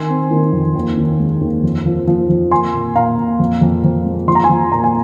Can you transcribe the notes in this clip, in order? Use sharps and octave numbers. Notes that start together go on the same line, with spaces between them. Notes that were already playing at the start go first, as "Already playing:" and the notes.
Already playing: D#3 G#5 C6
C4
D#3
F2
D#2
D#3
G#3
D#2
F2
F3
F3
F2
A#3 G#5 C6
A#2
A#2 F5 A#5
A#2
F2
F2
F2
G#3
F3 C6
A#5
G#5 C6
F3
A#2 A#5
G#5